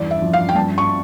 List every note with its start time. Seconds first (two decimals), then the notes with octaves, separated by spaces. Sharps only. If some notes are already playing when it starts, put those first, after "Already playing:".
Already playing: E2 G2 D5
0.11 E5
0.22 F3
0.33 F5
0.49 G5
0.55 G2 A5
0.78 C#6